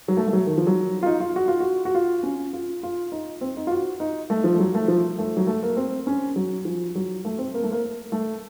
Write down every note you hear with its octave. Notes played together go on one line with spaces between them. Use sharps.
F#3
A3
A3
F#3
D#3
F3
F#3
F4
D#4
F4
F#4
F4
F#4
F#4
F4
C#4
F4
F4
D#4
C4
D#4
F4
F#4
D#4
A3
F3
A3
F#3
A3
F3
A3
F#3
A3
A#3
C4
C#4
F#3
F3
F#3
A3
C4
A#3
A3
A#3
A3